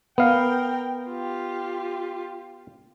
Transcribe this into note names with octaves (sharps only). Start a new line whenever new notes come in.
B3 A#4 F5 G5
F4 G4